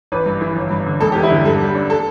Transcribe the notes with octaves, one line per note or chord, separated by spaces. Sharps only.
A1 B4
G2
E3
G1
G2
D3
E1 A4
G4
E2
E4
D3 G4
G2 A4
G3
D4
A4